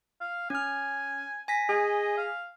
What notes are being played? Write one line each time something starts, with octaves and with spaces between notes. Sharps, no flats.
F5
C#4 G#5 F6
G#5 A#6 B6
G#4 D#5
F5